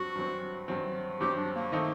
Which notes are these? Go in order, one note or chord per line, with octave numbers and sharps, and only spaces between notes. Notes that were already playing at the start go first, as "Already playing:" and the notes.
Already playing: G2 F#3 C4 F#4
G2 F#3 C4
G2 F#3 C4
G2 F#3 C4 G4
D4
A#3
D#3 A3 C4 D#4 A4